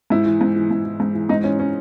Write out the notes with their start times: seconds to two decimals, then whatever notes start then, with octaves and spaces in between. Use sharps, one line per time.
0.10 G#2 E4
0.26 E3
0.41 G#2
0.56 E3
0.71 G#2
0.85 E3
1.00 G#2
1.14 E3
1.29 G#2 D#4
1.43 E3 C#4
1.59 C#4